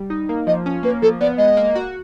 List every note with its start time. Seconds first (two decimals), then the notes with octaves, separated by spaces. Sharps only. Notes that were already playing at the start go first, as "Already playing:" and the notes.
Already playing: G3
0.10 D#4
0.29 A#3
0.47 F3 D#5
0.66 C#4
0.83 A#3 B4
1.02 F3 A4
1.21 B3 D5
1.38 G#3 D#5
1.57 A#3
1.75 F#4